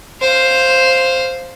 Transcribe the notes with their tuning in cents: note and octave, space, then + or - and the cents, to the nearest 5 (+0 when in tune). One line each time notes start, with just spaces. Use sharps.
C5 +0 F5 +0